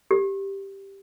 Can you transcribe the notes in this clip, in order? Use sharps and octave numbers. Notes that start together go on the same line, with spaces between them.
G4